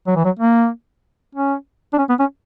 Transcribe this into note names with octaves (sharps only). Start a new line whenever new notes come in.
F#3
E3
F#3
A#3
C#4
D4
C#4
B3
C#4